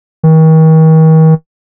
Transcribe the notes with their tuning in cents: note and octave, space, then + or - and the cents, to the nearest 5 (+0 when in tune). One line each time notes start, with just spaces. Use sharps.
D#3 +40